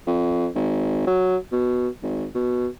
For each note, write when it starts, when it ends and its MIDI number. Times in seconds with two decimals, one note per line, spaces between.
0.07 0.48 41
0.55 1.05 32
1.07 1.37 54
1.52 1.88 47
2.03 2.25 32
2.35 2.67 47